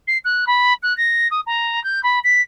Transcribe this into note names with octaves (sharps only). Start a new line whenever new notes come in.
C7
F#6
B5
F#6
A#6
D#6
A#5
G6
B5
B6